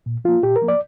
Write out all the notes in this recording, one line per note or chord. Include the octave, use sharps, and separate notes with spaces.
A#2
F3 A#3 F4
A#2 G4
A#4
F3 A#3
D5